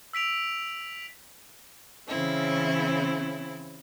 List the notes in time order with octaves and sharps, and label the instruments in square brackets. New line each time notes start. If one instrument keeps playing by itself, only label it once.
[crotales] E6 B6 D7 F7
[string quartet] C#3 E3 C4 C#4 E4